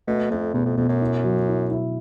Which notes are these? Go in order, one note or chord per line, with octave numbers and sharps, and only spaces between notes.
B2 A3
F2 A3
E2 B2
F2
F2 B2
F#2
E4
F#3
E4
E4